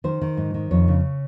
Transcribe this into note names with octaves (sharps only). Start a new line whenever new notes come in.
D#3 C5
D#3
G#2
D#3
F2 C#5
C#3